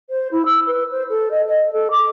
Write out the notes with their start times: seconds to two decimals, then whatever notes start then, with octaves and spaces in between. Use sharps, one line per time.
0.10 C5
0.31 E4
0.45 E6
0.67 B4
0.92 C5
1.09 A4
1.31 D#5
1.47 D#5
1.73 A4
1.91 D6